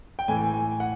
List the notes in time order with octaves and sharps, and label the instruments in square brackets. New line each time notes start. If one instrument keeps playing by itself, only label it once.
[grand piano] G5
A2 E3 A3 G#5
G#5
F#5